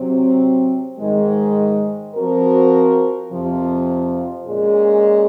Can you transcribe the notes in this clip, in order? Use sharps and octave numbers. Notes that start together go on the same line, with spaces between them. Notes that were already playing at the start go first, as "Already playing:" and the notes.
Already playing: C3 F#3 C4
G#2 D#3 G#3
F3 C4 F#4 A#4
F2 C3 F3
A#2 G#3 C#4 G#4